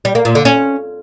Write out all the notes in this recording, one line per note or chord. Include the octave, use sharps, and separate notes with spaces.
G3
A#3
A#2
D3
C#4